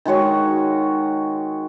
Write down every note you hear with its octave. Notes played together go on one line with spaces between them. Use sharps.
D#3 G#3 F#4 C#5